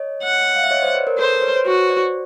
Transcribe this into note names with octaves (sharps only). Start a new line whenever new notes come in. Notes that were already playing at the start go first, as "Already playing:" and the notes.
Already playing: C#5 D#5
F#5
F5
E5
C#5 D#5
C5 D5
B4 C#5
A#4 C5
A4 B4 C5
B4 C#5
C5
F#4 B4 C#5
C5 D5